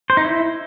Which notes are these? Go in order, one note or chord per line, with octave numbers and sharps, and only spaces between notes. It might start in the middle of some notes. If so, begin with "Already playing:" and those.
C5
D#4
E4